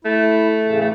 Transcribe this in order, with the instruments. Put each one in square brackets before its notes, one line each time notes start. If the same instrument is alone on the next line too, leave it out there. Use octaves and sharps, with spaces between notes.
[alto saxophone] A3 [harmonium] E4
[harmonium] A2 C#3 E3
[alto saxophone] A3